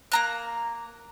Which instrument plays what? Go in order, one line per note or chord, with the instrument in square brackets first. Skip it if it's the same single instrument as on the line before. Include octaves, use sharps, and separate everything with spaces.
[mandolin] A#3 A#5 F#6